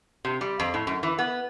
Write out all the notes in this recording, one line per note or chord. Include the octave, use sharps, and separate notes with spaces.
C3
G3
F2
A2
F#2
E3
B3